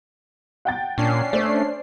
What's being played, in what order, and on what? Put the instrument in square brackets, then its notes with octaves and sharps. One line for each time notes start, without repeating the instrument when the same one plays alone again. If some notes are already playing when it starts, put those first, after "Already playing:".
[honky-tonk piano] F#5 G5 A6
[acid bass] A#2 [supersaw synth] C#4 D4 C7
[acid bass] A3 [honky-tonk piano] C5 D5